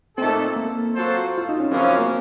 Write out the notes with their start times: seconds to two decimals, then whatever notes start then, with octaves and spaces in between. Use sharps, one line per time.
0.18 A#2 A3 C4 D#4 A4
0.56 A#3
0.95 F#3 A#3 F4 A4 C5
1.38 F4
1.49 D#4
1.60 C#4
1.71 F#2 C#3 F3 A#3 C4 C#4
2.00 A#3